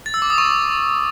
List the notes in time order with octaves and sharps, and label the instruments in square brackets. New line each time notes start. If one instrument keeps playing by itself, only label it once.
[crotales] A6
E6
D6
D#6
C#6